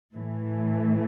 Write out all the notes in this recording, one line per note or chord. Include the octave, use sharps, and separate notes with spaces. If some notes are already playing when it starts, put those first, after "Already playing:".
A2 E3 A3